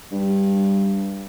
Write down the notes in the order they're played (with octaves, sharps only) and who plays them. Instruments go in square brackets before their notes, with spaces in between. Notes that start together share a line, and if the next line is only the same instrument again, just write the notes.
[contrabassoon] G2